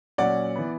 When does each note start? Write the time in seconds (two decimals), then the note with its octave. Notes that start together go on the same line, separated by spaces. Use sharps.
0.18 A#2 F#3 C#4 D5 F#5
0.55 E3 B3